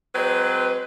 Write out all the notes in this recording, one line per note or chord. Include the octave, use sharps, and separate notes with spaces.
F#3 G#3 C4 B4